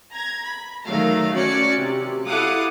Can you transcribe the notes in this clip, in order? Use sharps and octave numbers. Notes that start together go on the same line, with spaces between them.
A#5 G#6
B5
D#3 F#3 A3 F5 A#5
C#4 F#4 D5 C#7
C3
E4 A4 F5 F#5 D6 D#6